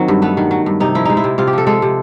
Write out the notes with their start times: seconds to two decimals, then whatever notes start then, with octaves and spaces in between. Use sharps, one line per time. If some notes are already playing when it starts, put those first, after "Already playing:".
Already playing: D#3 F#3 C4
0.08 G2
0.22 A3 B3
0.37 D#3
0.51 F#3
0.66 G2
0.80 C3 D#4
0.95 F3 E4
1.05 G#3 D#4
1.17 E4
1.24 C3
1.38 C3 F4
1.47 G4
1.53 F3 A4
1.67 G#3 A4
1.82 C3